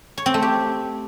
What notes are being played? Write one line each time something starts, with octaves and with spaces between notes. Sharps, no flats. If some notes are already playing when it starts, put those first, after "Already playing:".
C#5
C4
A3
G4